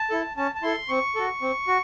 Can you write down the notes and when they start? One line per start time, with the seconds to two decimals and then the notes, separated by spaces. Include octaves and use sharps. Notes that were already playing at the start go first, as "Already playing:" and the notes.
Already playing: A5
0.10 E4 A4
0.37 C#4 A5
0.55 A5
0.63 E4 A4 C6
0.88 C4 C#6
1.16 F#4 A4
1.42 C4
1.68 F#4